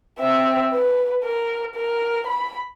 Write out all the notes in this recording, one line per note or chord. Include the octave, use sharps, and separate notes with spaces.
C4 E5
B4
A#4
A#4
B5